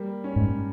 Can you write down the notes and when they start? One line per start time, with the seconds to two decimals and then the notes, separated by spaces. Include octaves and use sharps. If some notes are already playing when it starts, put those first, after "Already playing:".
Already playing: G3 A#3
0.24 C#4
0.36 G#2